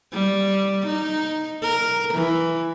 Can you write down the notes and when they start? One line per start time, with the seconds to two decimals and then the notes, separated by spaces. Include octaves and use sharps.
0.13 G3
0.86 D#4
1.63 A#4
2.14 E3